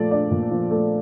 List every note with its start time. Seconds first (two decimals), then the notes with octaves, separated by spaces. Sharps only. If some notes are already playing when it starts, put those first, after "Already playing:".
Already playing: A#2 F3 A3 D5
0.11 D4 D5
0.31 A#2
0.51 F3
0.71 A3